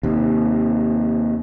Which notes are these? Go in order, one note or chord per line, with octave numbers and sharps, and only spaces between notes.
D#2 C3